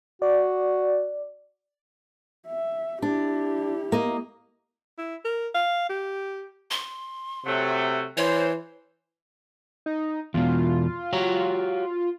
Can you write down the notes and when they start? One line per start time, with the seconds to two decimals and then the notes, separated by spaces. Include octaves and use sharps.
0.22 F#4 D5
2.47 E5
3.02 D4 E4 G4
3.92 A#3 D#5
4.98 E4
5.25 A#4
5.54 F5
5.89 G4
6.71 C6
7.46 C3 F#3 A3
8.17 E3 C5 C#5
9.86 D#4
10.34 E2 B2 F4
11.13 F#4 G4 C#5